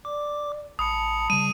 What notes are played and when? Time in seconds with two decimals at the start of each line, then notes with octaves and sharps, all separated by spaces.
0.05 D5 D6
0.79 A1 A5 B5 D#6 C#7
1.30 C#3 G3 D#7